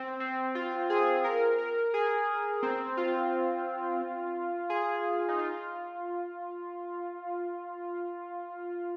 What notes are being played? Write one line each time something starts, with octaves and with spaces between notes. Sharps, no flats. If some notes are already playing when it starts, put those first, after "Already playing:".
Already playing: C4
C4
F4
G#4
A#4
A#4
G#4
C4
F4
G#4
D#4
F4